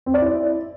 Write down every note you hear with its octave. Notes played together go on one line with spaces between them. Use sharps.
C4
D5
E4